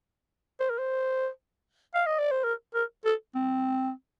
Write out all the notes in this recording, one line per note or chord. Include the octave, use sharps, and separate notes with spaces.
C5
A#4
C5
F5
D#5
D5
C5
A#4
A#4
A4
C4